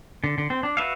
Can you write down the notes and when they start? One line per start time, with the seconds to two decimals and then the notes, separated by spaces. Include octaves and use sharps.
0.24 D3
0.38 D3
0.50 C4
0.63 D4
0.77 F#4 B4 E5 F5